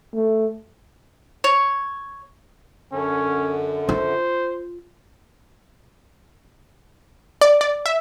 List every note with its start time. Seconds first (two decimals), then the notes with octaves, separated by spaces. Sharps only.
0.14 A3
1.44 C#5
2.92 F#2 D3 C#4
3.89 F4 C5
7.41 D5
7.61 D5
7.86 E5